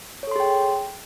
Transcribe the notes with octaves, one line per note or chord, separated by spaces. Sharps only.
G#4 A4 C#5 G5 C6